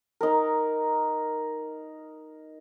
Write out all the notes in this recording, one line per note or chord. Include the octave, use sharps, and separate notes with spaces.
D#4 A#4